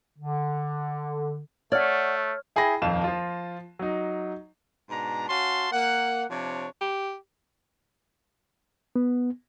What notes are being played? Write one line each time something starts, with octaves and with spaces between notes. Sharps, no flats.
D3
A3 C#5 D5 F#5 F6
E4 G#4 G5 B5 A#6
D#1 F2 F5 E7
F3 F4
F#3 D#4
G#2 B2 D4 A#5
C#4 F#4 F5 A5 C6
A#3 F#5
C3 F3 D4 C#5
G4
B3